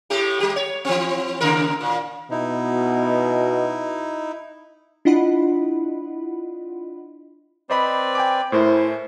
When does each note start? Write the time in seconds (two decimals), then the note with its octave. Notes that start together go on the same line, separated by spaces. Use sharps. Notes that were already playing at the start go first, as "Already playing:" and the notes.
0.10 A2 A3 G4
0.40 G3 G4
0.56 C#5
0.85 E3 C4
1.41 D#2 C#3 A#4
1.81 A#2
2.31 B2 D#4 E4
5.05 D4 E4 F4 D#5 F#5 B5
7.70 C4 B4 C5 D5 D#5 B5
8.15 G5 G#5 D6
8.52 A2 A3 E4 A#4 C5 G#5